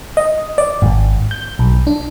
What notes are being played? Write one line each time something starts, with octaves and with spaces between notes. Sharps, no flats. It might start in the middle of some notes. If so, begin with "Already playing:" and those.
D#5
D5
G#1
G6
B1
D4